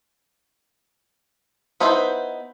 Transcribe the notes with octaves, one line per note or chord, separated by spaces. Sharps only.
B3 D#4 E4 B4 C5